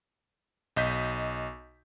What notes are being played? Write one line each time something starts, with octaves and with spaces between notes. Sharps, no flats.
B1 D#5 G6 B6